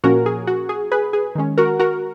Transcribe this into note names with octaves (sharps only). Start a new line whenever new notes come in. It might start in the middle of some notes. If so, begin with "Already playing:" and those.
A#2 F3 A#3 C#4 F#4 A#4
G#4
F#4
G#4
G#4 B4
G#4
D#3 G#3 C#4
F#4 A#4
F#4 A#4